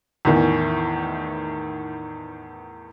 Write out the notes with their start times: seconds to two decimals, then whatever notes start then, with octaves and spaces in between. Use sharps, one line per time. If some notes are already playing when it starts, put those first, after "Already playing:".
0.25 E2 A2 D#3 E3